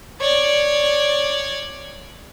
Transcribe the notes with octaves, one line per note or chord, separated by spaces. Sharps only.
C#5 D5